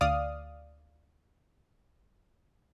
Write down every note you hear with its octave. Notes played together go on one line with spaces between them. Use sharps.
D2 D5 F5 D#6 F6